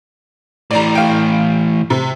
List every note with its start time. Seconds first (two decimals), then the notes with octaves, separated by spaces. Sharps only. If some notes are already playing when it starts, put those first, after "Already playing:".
0.71 A2 E3 D5 A#5
0.95 F5 G5
1.90 C3